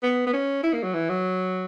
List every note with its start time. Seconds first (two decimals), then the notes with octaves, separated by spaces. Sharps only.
0.03 B3
0.27 B3
0.33 C#4
0.63 E4
0.74 A#3
0.83 F#3
0.94 E3
1.10 F#3